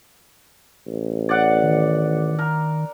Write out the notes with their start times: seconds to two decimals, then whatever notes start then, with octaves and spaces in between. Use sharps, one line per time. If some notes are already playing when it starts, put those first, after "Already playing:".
0.87 A1
1.29 D5 F#5
1.63 D#3
2.39 A#4